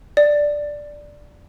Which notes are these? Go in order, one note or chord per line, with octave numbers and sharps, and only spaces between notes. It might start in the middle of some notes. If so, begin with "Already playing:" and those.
D5